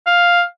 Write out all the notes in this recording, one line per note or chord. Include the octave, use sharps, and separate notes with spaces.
F5